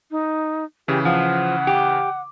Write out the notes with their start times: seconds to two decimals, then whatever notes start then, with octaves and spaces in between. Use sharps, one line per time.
0.11 D#4
0.88 C#3 E3 G4
1.05 F3 F#5
1.67 G4